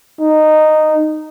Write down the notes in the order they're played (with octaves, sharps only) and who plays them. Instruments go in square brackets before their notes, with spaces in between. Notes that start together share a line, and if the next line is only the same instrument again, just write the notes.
[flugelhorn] D#4